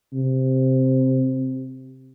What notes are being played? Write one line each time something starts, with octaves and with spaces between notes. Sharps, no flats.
C3